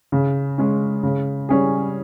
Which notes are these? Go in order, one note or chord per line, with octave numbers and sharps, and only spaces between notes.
C#3
G#3 C#4
C#3
G3 C#4 G#4